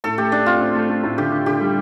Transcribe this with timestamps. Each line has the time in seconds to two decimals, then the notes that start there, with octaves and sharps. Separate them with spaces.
0.04 A2 A4
0.18 A3 G4
0.32 A3 D4
0.46 C4 F4
0.60 C4
0.75 A3
0.89 A3
1.04 A2
1.17 D3 G4
1.32 D3
1.46 D3 G4
1.60 G3